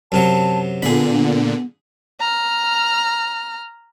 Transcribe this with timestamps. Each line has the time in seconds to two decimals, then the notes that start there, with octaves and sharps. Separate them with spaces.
0.12 F#2 C3 F#3 A5
0.82 A#2 D3 B3 G#4 B5
2.20 A#5 F6